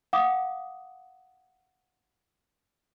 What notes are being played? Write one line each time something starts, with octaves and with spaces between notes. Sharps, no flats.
F5 F#5 D6 D#6